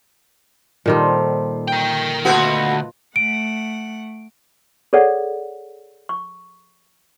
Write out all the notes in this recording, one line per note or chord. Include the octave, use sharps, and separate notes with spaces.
A#2 D#3 G3 A4 C5
A#4 G5
D2 A3 B3 F4 F#4 B4 D#5
A3 F#5 D7
G#4 A4 C#5 D5 F#5
C#6